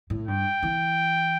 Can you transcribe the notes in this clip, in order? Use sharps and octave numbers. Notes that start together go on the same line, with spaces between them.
A2
G2 G5
E3